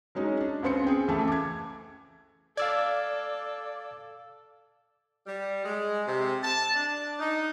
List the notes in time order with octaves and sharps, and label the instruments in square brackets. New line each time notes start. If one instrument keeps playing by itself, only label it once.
[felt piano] F#3 G#3 C#4 D#4
D4
C#2 C#3 B3 C4 C6 C#7
G#4 G5
C#2 E3 A3 E4 A5
D6 G#6
[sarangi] A4 [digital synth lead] D5 [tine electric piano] F5 E6 G#6
[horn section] G3
G#3
C3
A5
D4
D#4